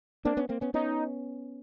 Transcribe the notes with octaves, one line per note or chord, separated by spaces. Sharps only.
A#3 C4 D4
B3 C#4
A#3 C4
B3 C#4
B3 C#4 D#4